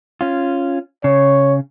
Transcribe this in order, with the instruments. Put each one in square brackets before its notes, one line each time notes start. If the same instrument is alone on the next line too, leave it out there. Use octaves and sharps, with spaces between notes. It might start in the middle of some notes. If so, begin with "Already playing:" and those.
[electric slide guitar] C#4 F4
[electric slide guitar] C#3 [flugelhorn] C#5